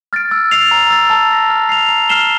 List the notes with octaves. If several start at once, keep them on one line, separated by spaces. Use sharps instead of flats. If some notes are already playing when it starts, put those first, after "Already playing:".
F6 A6 D7
E6
A6 C7 F7
A#5
E6 A6
A5
E6 A#6
F6
C7 F7
A#5
F6 C7 E7 G7